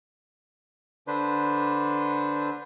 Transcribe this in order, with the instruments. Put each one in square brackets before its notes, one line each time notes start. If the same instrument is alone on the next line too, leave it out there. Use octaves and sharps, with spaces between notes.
[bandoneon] D3 D4 B4 C5